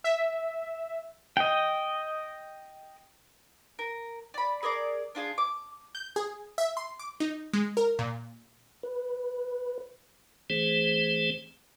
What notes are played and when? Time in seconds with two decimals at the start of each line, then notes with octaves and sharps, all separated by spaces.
0.04 E5
1.37 D#5 G5
3.79 A#4
4.34 D5 B5
4.63 G#4 A#4 D5 D6
5.15 D4 F4 G#4
5.38 D6
5.95 G6
6.16 G#4
6.58 E5
6.77 C6
6.99 D6
7.20 D#4
7.53 G#3
7.77 A#4
7.99 A#2
8.83 B4
10.50 E3 A3 C4 G#4 C5